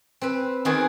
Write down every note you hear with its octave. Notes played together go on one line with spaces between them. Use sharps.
C4 B4
D#3 B3 C4 F#4 G#4